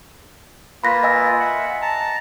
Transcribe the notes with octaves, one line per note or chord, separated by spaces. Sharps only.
A#3 F4 B4 B5 A#6 B6
D#5 G#5 E6
E5 F#5
A5 A#5